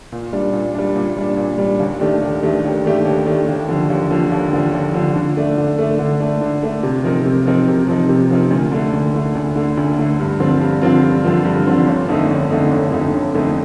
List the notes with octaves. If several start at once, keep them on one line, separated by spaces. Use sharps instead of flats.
A#2
G3 D4
A#2
G3 D4
A#2
G3 D4
A#2
G3 D4
D#2
D#3 A3 D4 G4
D#2
D#3 A3 D4 G4
D#2
D#3 A3 D4 G4
D#2
D#3 A3 D4 G4
D#2
D3 F3
D#2
D3 F3
D#2
D3 F3
D#2
D3 F3
D3
A3 D4
D3
A3 D4
D3
A3 D4
D3
A3 D4
C3
F3 C4 D#4 A#4
C3
F3 C4 D#4 A#4
C3
F3 C4 D#4 A#4
C3
F3 C4 D#4 A#4
D2
D3 A3
D2
D3 A3
D2
D3 A3
D2
D3 A3
G2
D3 F3 C4 F4
G2
D3 F3 C4 F4
G2
D3 F3 C4 F4
G2
D3 F3 C4 F4
G1
F2 D3 A3 D#4
G1
F2 D3 A3 D#4
G1
F2 D3 A3 D#4
G1
F2 D3 A3 D#4